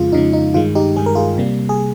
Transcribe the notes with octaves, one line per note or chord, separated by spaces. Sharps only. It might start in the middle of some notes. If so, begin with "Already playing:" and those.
Already playing: F2 C#3 G#3 F4
F2 C#3 G#3 D#4
D#4
G2 D#3 G#3 F4
D#4 G4
G2 D#3 G#3 G#4
A#4
F4 G#4
C3 G3 A#3
G#4